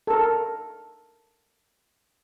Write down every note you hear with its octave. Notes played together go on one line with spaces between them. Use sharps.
A4 A#4